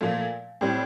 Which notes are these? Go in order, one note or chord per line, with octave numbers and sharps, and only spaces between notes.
A#2 F3 A3
A2 G3 C4